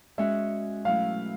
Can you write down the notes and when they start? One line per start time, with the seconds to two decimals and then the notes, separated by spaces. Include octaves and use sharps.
0.18 G#3 C#4 F#4 E5
0.85 B2 F#3 A3 C#4 E4 F5